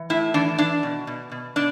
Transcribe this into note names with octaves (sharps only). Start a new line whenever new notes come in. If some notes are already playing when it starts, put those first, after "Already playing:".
Already playing: E3
A2 E4
E3 D4
E3 D4
B2
B2
B2
B2 D4